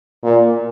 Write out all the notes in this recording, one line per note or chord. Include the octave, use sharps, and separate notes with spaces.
A#2